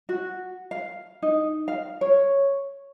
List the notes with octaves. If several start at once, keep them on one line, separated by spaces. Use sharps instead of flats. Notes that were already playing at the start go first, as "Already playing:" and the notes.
F#4
F5
D#4
F5
C#5